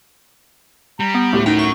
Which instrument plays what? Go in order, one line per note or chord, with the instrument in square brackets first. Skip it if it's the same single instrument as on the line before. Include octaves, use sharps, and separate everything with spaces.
[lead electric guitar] G3 [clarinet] A#5
[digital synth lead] B3
[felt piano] D2 A2 [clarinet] G4
[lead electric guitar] C#4 A#4 [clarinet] D#4 [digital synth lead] G5
[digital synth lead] C#6